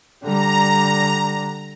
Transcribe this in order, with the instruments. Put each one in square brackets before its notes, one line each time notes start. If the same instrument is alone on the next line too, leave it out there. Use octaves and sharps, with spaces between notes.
[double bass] D3 G3 [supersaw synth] A#5